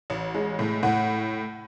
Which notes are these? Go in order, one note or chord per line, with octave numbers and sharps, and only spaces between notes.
A1
G#3
A2
A2 F#5